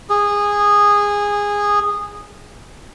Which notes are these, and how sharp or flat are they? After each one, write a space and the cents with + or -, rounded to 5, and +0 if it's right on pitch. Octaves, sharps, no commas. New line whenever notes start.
G#4 -15